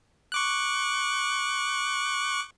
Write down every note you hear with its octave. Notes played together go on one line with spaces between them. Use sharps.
C#6 D6 F#6